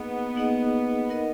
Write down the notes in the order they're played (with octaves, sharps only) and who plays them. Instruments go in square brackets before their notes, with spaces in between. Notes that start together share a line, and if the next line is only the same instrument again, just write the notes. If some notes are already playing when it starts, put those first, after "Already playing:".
Already playing: [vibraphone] A#3 D#4 G#4 D#5 F#5 [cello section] B3
[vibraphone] A#3 D#4 G#4 D#5 F#5
D#4 A#4 D#5 F#5